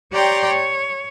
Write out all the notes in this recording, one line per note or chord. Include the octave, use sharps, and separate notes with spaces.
G4 C#5 D5 G5 A#5 C6
C#5